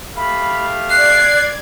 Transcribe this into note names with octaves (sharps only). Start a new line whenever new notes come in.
A3 G4 F5 B5
D5 F#6 G#6 C7